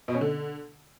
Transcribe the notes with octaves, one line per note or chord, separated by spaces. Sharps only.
B2
C#4
D3